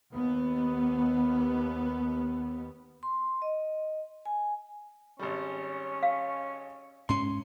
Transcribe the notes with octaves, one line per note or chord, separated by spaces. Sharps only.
D#2 B3
C6
D#5
G#5
G#1 G3 C#4
F5
G#2 C#4 C6